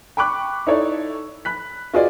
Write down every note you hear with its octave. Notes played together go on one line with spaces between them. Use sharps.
G5 B5 C#6 D6 F#6
D#4 E4 A4 C#5 D5
B5 F#6 B6
F4 F#4 G#4 B4 D5 D#5